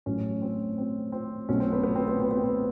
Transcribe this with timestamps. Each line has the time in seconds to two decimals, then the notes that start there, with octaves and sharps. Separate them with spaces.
0.06 A1 A2 F#3 A3 C#4
0.42 C4
0.78 C4
1.12 C4
1.49 B1 B2 F#3 A3 C#4
1.60 C4
1.72 B3
1.84 B3
1.95 C4
2.08 B3
2.20 C4
2.31 B3
2.44 C4